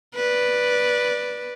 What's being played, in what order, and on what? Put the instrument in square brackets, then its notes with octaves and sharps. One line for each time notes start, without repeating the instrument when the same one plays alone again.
[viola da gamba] B4 D5